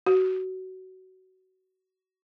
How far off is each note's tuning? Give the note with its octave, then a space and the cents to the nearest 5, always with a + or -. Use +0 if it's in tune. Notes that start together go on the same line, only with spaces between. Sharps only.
F#4 +20